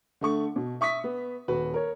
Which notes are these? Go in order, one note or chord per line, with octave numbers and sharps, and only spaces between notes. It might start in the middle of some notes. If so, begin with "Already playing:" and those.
D3 A3 C#6
B2
E5 C#6 D#6 B6
B3
D#1 F#4 B4
A#4 C#5